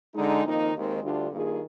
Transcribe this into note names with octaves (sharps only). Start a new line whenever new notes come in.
D3 G#3 D#4
F2 D#3 A#3 D#4
D#2 D#3 G#3 C4
D2 D3 G3 D4 F4
G2 D#3 A#3 F4 G#4